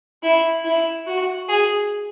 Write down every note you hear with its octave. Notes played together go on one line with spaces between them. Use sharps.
E4
E4
F#4
G#4